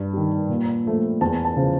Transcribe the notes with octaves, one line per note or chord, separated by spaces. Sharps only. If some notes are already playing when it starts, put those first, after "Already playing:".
Already playing: G2
D#3 G3
A#2
F3 A3
E2 A5
A5
C#3 F3